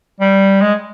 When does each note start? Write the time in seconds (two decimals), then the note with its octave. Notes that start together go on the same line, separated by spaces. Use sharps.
0.20 G3
0.61 G#3